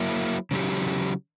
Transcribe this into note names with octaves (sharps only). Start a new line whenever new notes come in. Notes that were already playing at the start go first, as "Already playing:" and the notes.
Already playing: F#3 A#3 E4
C#3 F#3 A#3 E4 G4